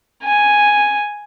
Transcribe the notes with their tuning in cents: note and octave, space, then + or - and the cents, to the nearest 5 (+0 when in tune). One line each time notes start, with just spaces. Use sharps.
G#5 +0